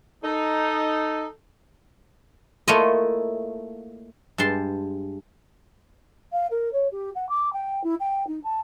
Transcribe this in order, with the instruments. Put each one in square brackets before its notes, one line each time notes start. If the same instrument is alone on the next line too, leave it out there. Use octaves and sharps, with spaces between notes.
[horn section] D#4 [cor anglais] A4
[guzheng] A3 A#3 E4 F4 C#5 D#5
G2 G#3 A5 C6
[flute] F5
A#4
C#5
G4
F#5
D6
G5
E4
G5
D#4
A5